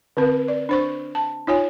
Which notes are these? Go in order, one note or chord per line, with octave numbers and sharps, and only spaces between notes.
D3 C4 B4
D5
D4 C5 C#6
A5
D#4 F4 C#5 G#5